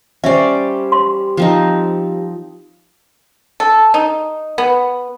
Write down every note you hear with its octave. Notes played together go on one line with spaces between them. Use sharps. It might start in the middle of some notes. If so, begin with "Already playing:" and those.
G3 C#4 G4 C5 D5 E5
C6
F3 C4 D#4
A4
D#4
B3